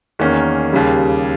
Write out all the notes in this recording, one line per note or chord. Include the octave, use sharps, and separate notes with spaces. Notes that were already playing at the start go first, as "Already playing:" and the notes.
E2 D#3 A#3 C#4
D#2 C#3 G3